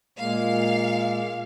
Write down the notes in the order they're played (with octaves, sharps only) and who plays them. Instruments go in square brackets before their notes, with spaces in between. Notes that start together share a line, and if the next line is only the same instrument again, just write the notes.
[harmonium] A#2 G#3 A#3 [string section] F5